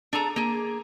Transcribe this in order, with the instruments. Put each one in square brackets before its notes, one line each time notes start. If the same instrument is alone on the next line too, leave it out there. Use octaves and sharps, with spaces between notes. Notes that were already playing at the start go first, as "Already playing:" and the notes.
[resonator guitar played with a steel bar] D4 G#4 A4 A#5
A#3 G#4